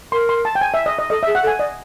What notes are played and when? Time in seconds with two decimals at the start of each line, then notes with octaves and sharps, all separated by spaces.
0.12 A#4 C6
0.29 C6
0.45 A5
0.55 G5
0.61 G#5
0.74 E5
0.86 D#5
0.99 D#5
1.10 A4 D#5
1.23 E5
1.27 G#4
1.35 F#5
1.43 A4
1.47 G#5
1.59 D5 D#5